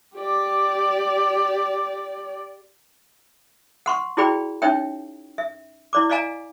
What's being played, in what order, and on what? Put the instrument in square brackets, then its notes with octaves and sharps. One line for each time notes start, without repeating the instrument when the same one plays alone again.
[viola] G4 D5
[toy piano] F#5 C6 C#6
E4 F#4 G#4 D5 G5 B5
C#4 D#4 C#5 E5 G5
E5
E4 D5 D6
D5 D#5 F5 G#5 A#5